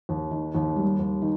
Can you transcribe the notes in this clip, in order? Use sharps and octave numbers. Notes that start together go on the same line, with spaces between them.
D#2
D#3
D#2
G3
D#2
D#3